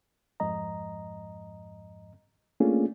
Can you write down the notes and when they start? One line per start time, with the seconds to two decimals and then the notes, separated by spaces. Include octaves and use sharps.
0.40 F2 G#2 D#5 A#5
2.60 A3 A#3 C#4 D4 F4 G#4